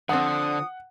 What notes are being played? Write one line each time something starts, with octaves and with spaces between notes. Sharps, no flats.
D3 F3 C4 F#5 D#6